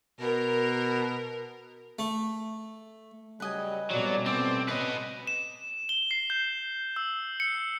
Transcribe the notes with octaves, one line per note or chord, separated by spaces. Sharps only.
B2 A#4
A3
C#3 F#3 G3 B4 D#5 G#5
F2 B2 F#3 G3 C#4 D5
A2 A3 B3 C4 D5
C#4 B4 D#5 C6
E7
G7
C7
G6
E6
C#7